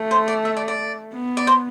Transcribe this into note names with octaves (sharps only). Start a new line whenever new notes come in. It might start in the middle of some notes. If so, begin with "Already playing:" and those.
Already playing: A3
C5
D5
E5
D5
D5
B3
D5
C5